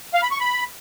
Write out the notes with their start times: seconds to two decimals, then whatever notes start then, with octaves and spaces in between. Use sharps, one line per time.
0.14 F5
0.23 B5
0.31 C#6
0.40 B5